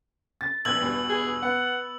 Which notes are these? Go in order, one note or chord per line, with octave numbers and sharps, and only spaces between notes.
A6
A#1 B2 E6 G#6 F#7
E2 G2 B2
G#4
B3 F#5